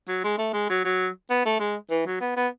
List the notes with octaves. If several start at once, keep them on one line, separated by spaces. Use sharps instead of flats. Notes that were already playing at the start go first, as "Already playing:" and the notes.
F#3
G#3
A3
G#3
F#3
F#3
B3
A3
G#3
E3
F#3
B3
B3